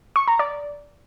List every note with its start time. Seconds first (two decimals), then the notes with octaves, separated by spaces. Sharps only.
0.16 C#6
0.28 A#5
0.39 D5